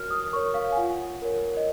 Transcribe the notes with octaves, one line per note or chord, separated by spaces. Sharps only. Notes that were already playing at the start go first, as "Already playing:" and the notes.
Already playing: F#4 A#4 C#5 F6
D#6
A#4 C#5 C#6
F5
G#5
F4 F#5
A#4 C#5
D#5